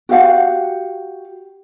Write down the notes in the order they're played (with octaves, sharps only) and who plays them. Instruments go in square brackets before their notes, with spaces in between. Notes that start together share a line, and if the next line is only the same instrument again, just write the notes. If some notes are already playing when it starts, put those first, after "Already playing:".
[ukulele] F#4 G4 F5 F#5